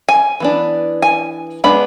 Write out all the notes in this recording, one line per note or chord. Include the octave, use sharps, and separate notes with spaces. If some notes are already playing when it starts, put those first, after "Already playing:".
G#5
E3 B3 D4
G#5
G#3 B3 D4 B5